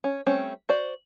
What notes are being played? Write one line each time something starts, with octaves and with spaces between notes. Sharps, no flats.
C#4
G3 A3 C4 C#4
F#4 C5 D5